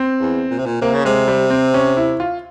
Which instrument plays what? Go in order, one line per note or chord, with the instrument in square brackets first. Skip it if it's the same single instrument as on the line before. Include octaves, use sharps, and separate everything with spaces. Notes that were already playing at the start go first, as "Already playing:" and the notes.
Already playing: [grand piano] C4
[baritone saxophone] E2
A#2
C3
A#2
[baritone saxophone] C3 [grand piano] A#3
[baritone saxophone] C#3
[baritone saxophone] C3 [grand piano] G#3
[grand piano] G3
C4
C#4
E4
F4